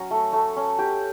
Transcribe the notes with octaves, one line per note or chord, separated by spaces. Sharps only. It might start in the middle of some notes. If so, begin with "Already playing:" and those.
Already playing: F#3 C#4
A3
A3
C#4
G4